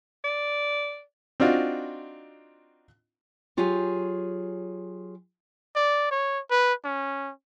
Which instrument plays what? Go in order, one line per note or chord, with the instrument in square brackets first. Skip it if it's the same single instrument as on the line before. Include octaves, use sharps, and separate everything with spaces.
[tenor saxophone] D5
[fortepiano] C4 D4 D#4 F4 F#4
[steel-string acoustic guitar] F#3 F4 G4 G#4 C#5 G#5
[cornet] D5
C#5
B4
C#4